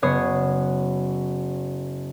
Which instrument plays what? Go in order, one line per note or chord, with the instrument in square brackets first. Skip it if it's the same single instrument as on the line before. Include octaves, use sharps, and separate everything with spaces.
[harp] F#1 B3 C#5 D#6 C7